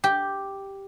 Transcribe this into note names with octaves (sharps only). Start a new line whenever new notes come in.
G4